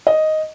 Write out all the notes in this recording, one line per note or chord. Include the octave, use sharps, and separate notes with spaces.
D#5